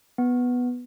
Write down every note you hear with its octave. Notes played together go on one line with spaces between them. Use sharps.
B3